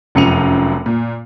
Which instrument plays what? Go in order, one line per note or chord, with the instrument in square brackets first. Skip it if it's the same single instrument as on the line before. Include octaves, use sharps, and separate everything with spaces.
[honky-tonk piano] F1 F#2 F3 C#7 D#7 F7
A#2